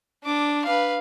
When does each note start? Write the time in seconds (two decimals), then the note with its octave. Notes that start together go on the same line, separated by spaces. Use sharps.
0.24 D4 D6
0.65 B4 F5